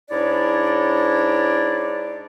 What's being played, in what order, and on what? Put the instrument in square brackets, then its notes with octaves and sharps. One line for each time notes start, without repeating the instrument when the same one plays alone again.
[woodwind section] G#2 D4 E4 C#5 D5